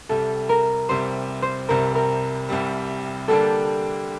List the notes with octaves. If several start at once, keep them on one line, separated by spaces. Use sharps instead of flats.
C2 C3 G3 A4
A#4
C2 C3 G3 C5
C5
C2 C3 G3 A#4
A#4
C2 C3 G3
D3 G3 A#3 D4 G4 A4